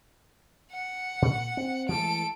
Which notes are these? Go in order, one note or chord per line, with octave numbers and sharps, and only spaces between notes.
F#5
A#2
C4
E3 G#3 A3 A4 D7